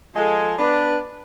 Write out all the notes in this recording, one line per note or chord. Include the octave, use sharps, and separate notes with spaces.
F3 G#3 A4
B3 D4 B4